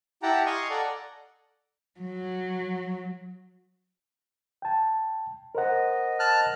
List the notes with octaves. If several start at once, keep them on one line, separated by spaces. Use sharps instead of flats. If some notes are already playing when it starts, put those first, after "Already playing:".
E4 G4 F#5 G5 A5 A#5
D#5 F5 G#5 C6 C#6 D#6
A4 D5 F#5 A#5
F#3
G5 A5
A#4 C5 D#5 F#5
A5 F6 F#6